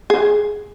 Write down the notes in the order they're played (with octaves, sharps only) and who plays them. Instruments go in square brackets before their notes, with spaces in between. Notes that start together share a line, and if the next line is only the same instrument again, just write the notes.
[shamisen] G#4